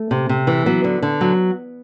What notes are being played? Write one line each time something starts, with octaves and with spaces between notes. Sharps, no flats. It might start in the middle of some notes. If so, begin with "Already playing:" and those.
Already playing: A3
C3
C3
E3
F#3 B3
D3
D3
F#3